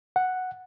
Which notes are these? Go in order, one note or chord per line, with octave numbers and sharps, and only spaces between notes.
F#5